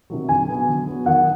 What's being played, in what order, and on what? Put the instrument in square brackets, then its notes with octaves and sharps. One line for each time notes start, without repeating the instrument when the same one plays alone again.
[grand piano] C3 D#3 F#3
[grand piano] D3 [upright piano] G#5
[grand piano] F#3 B3
D3
F#3 B3
[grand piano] D#3 [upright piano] F#5